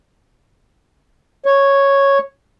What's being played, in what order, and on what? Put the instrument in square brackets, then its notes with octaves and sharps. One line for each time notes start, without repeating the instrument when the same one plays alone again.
[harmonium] C#5